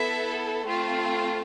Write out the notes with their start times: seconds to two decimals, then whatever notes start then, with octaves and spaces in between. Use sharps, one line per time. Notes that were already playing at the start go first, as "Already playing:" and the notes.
Already playing: B3 E4 A4 E5
0.65 A3 C4 F4